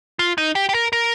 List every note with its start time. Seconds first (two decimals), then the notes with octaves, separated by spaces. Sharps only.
0.19 F4
0.38 D#4
0.55 G4
0.69 G4
0.74 A#4
0.93 A#4